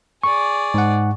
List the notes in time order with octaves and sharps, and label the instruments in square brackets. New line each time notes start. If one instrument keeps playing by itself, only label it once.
[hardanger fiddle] G#4 D5 [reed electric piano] C#6
[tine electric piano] G#2 F#5